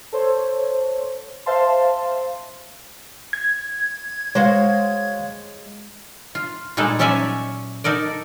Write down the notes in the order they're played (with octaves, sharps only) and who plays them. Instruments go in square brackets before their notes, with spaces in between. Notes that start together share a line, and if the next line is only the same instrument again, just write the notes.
[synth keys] A4 C5 C#5
C5 E5 F5 A5 C6
[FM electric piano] G#6
[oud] G#3 F#4 C5 [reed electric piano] C#5 F5
[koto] F4
A#2 G3 G#3 D#4 A4
F#3 C#4 C#5 D5 E5 G#5
D#4 A4 A#4 D5